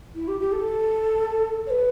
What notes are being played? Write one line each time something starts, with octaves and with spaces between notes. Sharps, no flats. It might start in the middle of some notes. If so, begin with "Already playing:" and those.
E4
G4
G4
A4
C#5
B4